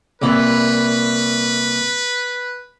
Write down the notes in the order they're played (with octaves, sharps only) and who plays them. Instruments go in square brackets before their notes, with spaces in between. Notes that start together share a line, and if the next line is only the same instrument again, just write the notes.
[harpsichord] C2 A#2 E4 [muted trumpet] B4